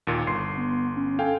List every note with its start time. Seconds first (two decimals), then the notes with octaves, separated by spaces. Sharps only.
0.07 D#2 A#2
0.27 G1 C6 C7
0.57 B3
0.96 C#4
1.19 A4 F5 G5 G#5